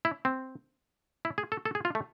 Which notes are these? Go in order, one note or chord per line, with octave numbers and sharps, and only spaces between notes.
E4
C4
E4
G#4
A4
A4
G#4
F4
A3